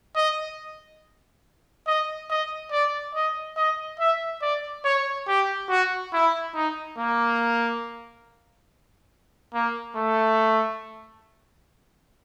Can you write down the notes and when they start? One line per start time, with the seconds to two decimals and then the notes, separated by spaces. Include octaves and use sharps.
0.16 D#5
1.87 D#5
2.30 D#5
2.72 D5
3.15 D#5
3.57 D#5
4.00 E5
4.42 D5
4.85 C#5
5.28 G4
5.70 F#4
6.13 E4
6.55 D#4
6.98 A#3
9.54 A#3
9.96 A3